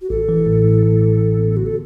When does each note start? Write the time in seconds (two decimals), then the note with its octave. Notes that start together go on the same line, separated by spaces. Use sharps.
0.02 F#4
0.10 A1 A4
0.29 E3
0.46 A2
0.64 A2
0.83 A2
1.01 E3
1.21 A2
1.39 B3
1.57 D3 F#4
1.66 A4